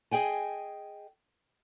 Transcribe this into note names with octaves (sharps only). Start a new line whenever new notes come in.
G#4 D#5 G5 G#5